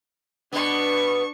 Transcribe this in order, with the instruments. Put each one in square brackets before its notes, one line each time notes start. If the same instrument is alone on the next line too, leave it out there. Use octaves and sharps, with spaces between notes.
[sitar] B2 B3 [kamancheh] D4 C#6